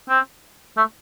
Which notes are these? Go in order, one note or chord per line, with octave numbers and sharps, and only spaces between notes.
C4
A3